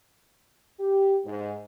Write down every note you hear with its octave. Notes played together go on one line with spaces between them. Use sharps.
G4
G#2